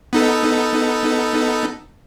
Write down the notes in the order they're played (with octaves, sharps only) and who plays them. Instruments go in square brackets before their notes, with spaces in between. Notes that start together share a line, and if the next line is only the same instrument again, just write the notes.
[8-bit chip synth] B3 D#4 A4